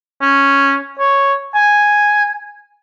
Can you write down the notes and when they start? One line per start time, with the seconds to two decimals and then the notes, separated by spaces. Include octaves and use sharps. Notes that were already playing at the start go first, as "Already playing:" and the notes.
0.22 C#4
0.99 C#5
1.55 G#5